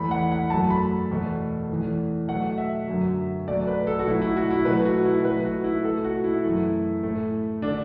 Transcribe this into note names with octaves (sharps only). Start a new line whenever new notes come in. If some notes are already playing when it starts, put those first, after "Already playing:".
Already playing: E2 E3 A3 B5
F#5
F#5
F#2 F#3 A3 A5
B5
E2 B2 A3
E2 E3 A3
B2 F#3 A3 F#5
E5
F#2 D3 F#3
B2 F#3 A3 D5
B4
A4
F#4
B2 F#3 A3 E4
E4
F#4
E4
B2 F#3 A3 B4
F#4
E4
B2 F#3 A3 B4
F#4
E4
B2 A3 A4
F#4
E4
F#2 E3 A3
A2 A3
D3 A3 D4